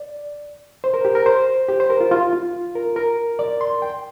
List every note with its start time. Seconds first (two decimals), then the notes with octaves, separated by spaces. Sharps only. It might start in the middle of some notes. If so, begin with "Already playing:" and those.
Already playing: D5
0.84 C5
0.94 A#4
1.05 G4
1.15 A#4
1.26 C5
1.69 G4
1.80 C5
1.90 A#4
2.00 F4
2.12 F4
2.33 F4
2.75 A#4
2.96 A#4
3.39 D5
3.61 C6
3.82 G5